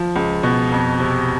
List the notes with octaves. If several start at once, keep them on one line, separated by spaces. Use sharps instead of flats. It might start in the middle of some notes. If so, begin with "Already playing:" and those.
Already playing: F3
C#2
B2
F2
C3